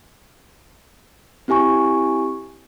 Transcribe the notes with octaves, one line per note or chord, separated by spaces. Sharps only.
C4 E4 G4 G#5 C#6